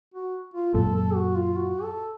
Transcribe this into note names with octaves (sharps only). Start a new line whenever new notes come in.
F#4
F4
F#2 A#2 A4
A4
F#4
F4
F#4
A4